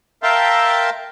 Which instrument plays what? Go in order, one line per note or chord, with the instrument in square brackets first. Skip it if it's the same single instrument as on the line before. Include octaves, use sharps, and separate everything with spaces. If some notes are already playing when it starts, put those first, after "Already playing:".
[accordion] A#4 E5 F5 G5 A5 C6